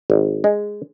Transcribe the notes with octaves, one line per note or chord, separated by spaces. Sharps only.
G#1
G#3